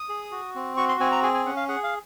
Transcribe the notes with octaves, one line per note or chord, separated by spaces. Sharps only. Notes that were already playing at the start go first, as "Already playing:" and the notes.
Already playing: D#6
G#4
F#4
C4
F#4 C#6
C6
C4 G#5
A#5
G#4 G#5
G#5
C#4 F#5
F5
G#4 F#5
F5